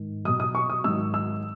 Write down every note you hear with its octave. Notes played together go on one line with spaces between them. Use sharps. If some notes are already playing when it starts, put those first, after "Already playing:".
Already playing: G#2 D#3
B2 F#3 D#6
D#6
C#6
D#6
G#2 D#3 F#3 E6
E6